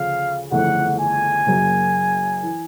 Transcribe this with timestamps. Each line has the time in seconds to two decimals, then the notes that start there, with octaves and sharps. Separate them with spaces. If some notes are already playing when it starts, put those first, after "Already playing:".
Already playing: D2 C#3 F3 F5
0.51 G1 F2 C#3 E3 A3 F#5
0.99 G#5
1.47 F#1 F#2 C#3 F#3 A#3
2.43 E3